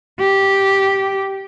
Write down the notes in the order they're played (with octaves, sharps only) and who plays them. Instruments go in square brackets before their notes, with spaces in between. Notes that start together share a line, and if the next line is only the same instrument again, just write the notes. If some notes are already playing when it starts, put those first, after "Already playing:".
[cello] G4